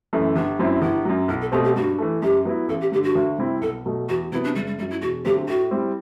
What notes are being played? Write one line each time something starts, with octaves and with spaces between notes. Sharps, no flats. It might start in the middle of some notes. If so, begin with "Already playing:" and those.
F#2 E3 A3
G1 D4
F#2 F#3 C4 E4
G1 E4
F#2 F#3
B1 E4
A4
B2 A3 C4 G4
G4
G2 F#4
E3 A3
F#2 G4
F#3 B3 E4
A1 A4
G4
G2 D3 G4
F#4
D2
C3 G3 C4 E4
B1 A4
B2 F#3 A3
E2 F#4
C3 F#3 B3 E4
D4
F#1 G3
G3
F#2 F#3 G3
E4
E1 F#4
D2 D3 F#3 C4 G4
A2 F#4
G3 C4 E4